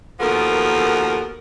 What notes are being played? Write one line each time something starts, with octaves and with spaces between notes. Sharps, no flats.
D#2 B2 F3 B3 A4 A#4